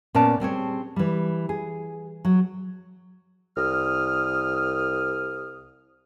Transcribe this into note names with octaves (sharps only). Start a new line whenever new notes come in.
A#2 B3 C#4 D5 A5
G3 C4 G#4 C#5
E3 G3
G#4
F#3
C2 D#6 F6